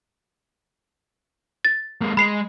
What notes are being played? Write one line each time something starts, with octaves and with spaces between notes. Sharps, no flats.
A6
G#3 A#3
G#3 B5 C7 F7